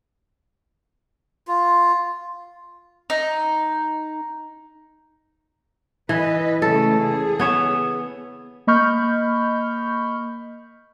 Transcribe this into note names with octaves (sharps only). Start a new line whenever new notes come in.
F4
D#4
E3 B4 D#5
C#3 A3 A4
G#4
B3 C#5 E5
A#3 D#5 B5 C#6 F6 G6